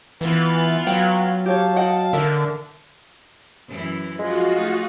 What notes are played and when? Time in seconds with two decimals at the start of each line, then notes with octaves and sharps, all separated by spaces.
0.21 E3 B3 F4 B4
0.87 F#3 F5 G5
1.46 G4 C#5 F5 A5
1.76 D#5 F#5 G5
2.13 D3 A#4 E5
3.68 F#2 E3 E4
4.19 F3 G#3 F4 F#4
4.55 A3 D#4 G#4